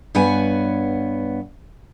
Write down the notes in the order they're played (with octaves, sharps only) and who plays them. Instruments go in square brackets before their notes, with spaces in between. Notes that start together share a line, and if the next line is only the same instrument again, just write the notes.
[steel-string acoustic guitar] G2 B3 C#5 F#5 G#5